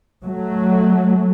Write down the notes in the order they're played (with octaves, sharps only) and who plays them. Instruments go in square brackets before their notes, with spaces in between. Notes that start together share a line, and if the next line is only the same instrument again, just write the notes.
[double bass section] F#3 A3